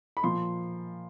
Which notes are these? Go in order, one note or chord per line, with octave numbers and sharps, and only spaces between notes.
B5
A#2 F3 A#3 C6